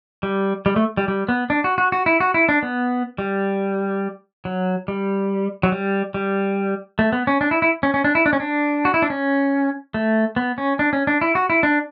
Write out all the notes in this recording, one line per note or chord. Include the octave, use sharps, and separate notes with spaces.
G3
G3
A3
G3
G3
B3
D4
F#4
F#4
F#4
E4
F#4
E4
D4
B3
G3
F#3
G3
F#3
G3
G3
A3
B3
C#4
D4
E4
E4
C#4
C#4
D4
E4
D4
C#4
D4
F#4
E4
D4
C#4
A3
B3
C#4
D4
C#4
D4
E4
F#4
E4
D4